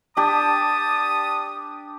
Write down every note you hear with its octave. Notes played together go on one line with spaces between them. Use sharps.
D4 G4 A5 D#6